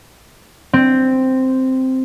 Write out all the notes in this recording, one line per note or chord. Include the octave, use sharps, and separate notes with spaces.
C4